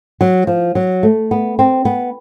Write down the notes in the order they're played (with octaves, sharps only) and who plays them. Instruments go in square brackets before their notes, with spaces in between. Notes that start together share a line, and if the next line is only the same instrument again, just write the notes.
[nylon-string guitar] F#3
F3
F#3
A3
B3
C4
B3